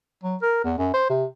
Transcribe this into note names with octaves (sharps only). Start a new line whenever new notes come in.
F#3
A#4
E2
F#2
C5
C3